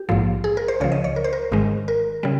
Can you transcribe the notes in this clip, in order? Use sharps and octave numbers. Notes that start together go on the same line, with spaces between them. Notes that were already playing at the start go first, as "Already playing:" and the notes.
Already playing: G4
A#1 G#2 F3
G#4
A#4
C5
C#2 C#3 F3 C#5
D#5
C#5
A#4
C5
A#4
G#1 G#2 D#3 G#3
A#4
C#3 G3